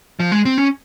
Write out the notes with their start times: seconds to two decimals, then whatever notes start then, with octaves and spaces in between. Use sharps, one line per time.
0.20 F3
0.32 G#3
0.45 C4
0.58 C#4